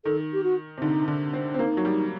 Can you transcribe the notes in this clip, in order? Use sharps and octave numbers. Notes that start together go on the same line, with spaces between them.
D#3 A4
G4
F#4
C3
D3 D#4
D3
C4
C4
A#3 D#4
F#3
G3